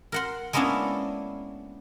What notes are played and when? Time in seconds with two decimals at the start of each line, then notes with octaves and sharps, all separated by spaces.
0.12 A#4 F#5 C6
0.53 G#3 A#3 B3 C#4 D4 E4